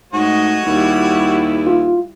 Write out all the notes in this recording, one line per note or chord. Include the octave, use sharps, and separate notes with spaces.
G#2 A3 F#4 C#5 D#5
D#2 G3 E4
F4